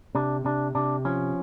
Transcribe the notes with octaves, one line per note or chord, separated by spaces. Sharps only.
C3 D4
C3 D4
C3 D4
F3 C#4